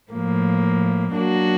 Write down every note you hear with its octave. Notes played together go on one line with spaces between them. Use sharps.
A2 F3 A#3
F#3 A#3 D4 F#4